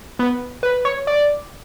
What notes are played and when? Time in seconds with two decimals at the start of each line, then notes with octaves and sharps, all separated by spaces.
0.19 B3
0.63 B4
0.85 C#5
1.07 D5